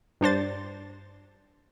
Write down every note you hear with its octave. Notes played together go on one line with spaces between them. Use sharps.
G2 D4 C5 A6